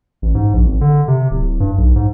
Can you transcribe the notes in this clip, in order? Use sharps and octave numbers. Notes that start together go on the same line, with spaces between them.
A1
G#2
A#1
G#1
D3
C3
D1
G2
B1
G#2